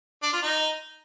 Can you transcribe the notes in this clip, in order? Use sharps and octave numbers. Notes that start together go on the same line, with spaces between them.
D4
F4
D#4